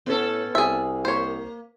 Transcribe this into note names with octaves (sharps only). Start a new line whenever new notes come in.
A2 B3 C#4 A4
C2 G#4 E5
A#3 C5 C#5